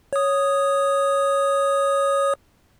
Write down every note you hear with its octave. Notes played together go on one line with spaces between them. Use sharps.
C#5 D#6